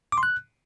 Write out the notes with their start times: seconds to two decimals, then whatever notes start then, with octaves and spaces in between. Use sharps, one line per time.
0.12 D6
0.18 C6
0.23 F#6